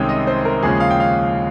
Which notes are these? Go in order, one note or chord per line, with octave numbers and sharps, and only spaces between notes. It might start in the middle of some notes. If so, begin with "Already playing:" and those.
Already playing: C2 C3 D#3 G#3 C#4 G5
D#5
C5
A#4
D#2 C#3 F3 G#3 C#4 G#4
F5
G5
F5